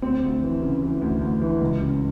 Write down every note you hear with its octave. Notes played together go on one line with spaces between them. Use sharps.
D2 C4
D2
E3
C#3
E3
D2
D2
E3
C#2
C#3